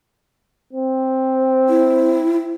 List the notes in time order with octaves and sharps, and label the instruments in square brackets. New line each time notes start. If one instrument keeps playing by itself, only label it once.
[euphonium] C4
[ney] E4